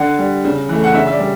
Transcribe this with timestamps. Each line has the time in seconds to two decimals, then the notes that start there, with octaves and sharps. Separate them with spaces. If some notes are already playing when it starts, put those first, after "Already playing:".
Already playing: D3 F#5
0.19 G3
0.44 C#3
0.69 E3 A3
0.84 F#5
0.94 C#3 E5
1.06 E5
1.12 D5
1.20 G3